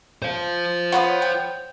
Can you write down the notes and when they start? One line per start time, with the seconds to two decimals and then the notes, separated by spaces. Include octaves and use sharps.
0.22 C5 F5
0.92 F4 B4 C#5 F#5 D#6
1.22 G5